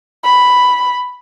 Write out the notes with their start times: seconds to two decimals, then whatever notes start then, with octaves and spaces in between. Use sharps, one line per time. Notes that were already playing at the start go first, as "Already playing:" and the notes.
0.23 B5